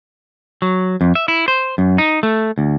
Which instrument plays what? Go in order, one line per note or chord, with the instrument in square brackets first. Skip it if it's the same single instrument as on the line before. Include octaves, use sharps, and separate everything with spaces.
[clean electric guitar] F#3
F2
E5
E4
C5
F#2
D#4
A3
D2